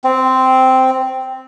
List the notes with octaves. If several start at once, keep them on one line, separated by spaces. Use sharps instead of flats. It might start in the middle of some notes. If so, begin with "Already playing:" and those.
C4